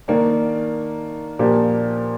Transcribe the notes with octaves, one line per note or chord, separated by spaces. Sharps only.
D#3 A#3 D4
A#2 F3 A#3 D4 G4